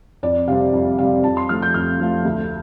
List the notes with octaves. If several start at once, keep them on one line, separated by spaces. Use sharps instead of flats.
F2 D5
C3 G3 C4 F5
F2
C3 G3 C4 F5
F2 A5
C6
F3 A3 F4 F6
G6
F2 F6
F3 A3 F4
D2